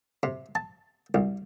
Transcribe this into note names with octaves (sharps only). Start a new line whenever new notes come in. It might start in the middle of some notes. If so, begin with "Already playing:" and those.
C3
A5
C2